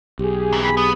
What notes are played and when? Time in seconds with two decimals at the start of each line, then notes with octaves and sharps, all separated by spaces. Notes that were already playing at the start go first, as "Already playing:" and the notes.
0.19 B1 G4 G#4
0.53 F#2 E3
0.64 B5
0.77 B3 D#6